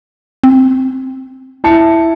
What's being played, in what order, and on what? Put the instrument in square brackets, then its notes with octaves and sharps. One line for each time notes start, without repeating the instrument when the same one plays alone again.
[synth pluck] C4
[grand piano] E4 A5 C#7